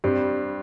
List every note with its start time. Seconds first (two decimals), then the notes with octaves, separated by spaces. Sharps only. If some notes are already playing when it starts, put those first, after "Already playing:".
0.04 G2 G3 C4